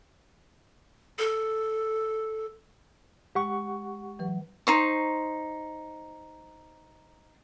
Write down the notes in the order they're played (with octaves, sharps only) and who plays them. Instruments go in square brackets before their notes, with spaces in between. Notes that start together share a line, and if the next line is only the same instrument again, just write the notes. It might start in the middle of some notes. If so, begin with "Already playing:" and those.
[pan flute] A4
[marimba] G#3 [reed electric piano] G4 F#5 C#6
[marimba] E3 F#3 B4
[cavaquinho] D#4 C5 C#6